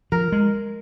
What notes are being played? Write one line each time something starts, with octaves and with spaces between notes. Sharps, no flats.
F3 A#4
G#3